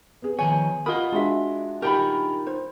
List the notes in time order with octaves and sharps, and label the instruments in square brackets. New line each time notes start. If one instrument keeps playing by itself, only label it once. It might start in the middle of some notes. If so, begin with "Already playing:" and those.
[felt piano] B3 G#4
[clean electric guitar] D#3 F3 C#5 [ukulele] G#5
[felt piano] F4 D#6 [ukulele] A#4 [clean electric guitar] D#5 F#5 B5
[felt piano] G#3 D4 F#4 [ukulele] F4 E5
[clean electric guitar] D#4 F4 A#4 [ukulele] G4 A#5 B5
[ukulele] C5